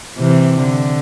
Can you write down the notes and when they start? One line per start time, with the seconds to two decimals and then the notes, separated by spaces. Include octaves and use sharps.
0.17 C3 E3
0.61 D3